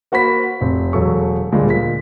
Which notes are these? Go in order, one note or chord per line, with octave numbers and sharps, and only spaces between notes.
A#3 F#4 C5 B5 B6
F1 C4
E1 F#3 A4 C#6
D2 A#2 G3 G#3
A#2 B6